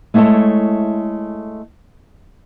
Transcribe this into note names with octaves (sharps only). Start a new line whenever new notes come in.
G#3 A3 E4 A4 C#5